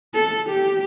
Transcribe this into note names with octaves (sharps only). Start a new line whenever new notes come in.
A4
G4